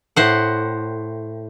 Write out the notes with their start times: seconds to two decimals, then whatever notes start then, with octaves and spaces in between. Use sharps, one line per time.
0.16 A2 C5 F#5